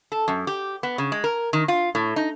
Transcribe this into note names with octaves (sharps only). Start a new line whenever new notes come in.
A4
F#2
G4
B3
C#3
G#3
A#4
D#3
F4
A2
D#4